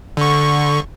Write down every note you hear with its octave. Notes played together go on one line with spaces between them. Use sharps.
D3 C#6